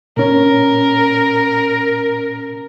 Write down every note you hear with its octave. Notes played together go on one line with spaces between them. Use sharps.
A#2 C#4 A#4